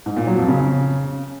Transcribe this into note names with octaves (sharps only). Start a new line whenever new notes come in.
G#2
A#2
F#3
F2
C#3